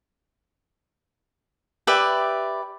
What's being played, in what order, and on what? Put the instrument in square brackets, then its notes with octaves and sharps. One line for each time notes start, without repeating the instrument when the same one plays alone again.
[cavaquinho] G4 B4 D5 E5